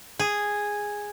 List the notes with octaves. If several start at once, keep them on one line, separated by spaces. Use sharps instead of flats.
G#4